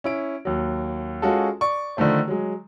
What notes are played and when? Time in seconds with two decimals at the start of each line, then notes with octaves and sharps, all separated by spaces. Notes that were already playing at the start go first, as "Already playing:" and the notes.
0.04 C#4 E4 D7
0.45 D#2 F#3
1.22 G#3 C#4 F4 F#4 G#4 A4
1.61 D5 C#6
1.97 D3 D#3 F3 A3 C5
2.28 F#3 G#3